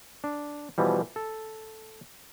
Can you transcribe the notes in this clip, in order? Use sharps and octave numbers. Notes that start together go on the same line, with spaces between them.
D4
B2 E3 F3 G3
A4